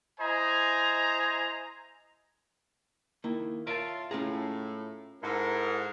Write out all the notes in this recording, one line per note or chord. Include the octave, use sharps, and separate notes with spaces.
E4 C5 D#5 G#5 A#5
D#3 A#3 E4
F4 A#4 C#5 D5 E5 A5
A2 C#4 F4 G#4 A#5
G#2 E4 A4 A#4 F#5